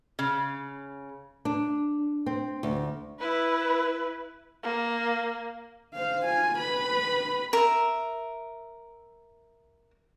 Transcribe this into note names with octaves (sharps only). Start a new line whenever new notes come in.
C#3
D4
C4
D2
E4 B4
A#3
C5 F5
F4 G#5
B4 B5
A#4 E5